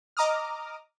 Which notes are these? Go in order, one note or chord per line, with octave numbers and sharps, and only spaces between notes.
D#5 A#5 D6 D#6 F6